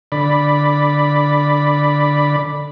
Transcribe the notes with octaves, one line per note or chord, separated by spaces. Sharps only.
D3 D5 B5